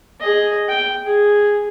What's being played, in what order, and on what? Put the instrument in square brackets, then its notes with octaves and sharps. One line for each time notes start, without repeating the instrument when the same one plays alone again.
[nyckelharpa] G#4 D#5
G5
G#4